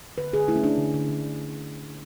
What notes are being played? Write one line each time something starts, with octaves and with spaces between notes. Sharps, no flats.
D3 B4
D3 G#4
A3 E4
C#4
A3 D4
D3
D3
D3